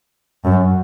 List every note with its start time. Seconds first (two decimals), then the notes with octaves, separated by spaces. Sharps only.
0.45 F#2